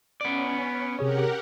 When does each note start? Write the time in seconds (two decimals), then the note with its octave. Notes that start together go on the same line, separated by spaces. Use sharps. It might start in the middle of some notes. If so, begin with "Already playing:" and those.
0.21 B3 C#4 D5
0.99 C3 G4 G#4 A#4 C#5 F#5